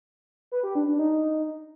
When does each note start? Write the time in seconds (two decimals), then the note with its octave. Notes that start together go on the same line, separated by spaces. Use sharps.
0.52 B4
0.63 G4
0.75 D4
0.87 D4
0.99 D#4